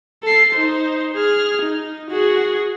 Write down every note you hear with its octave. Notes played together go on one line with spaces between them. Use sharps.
A4 C7
D#4 C5
G#4 F6
D#4
F#4 G#4